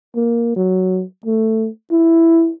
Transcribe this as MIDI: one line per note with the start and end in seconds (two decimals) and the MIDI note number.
0.16 0.54 58
0.56 1.03 54
1.26 1.68 57
1.92 2.51 64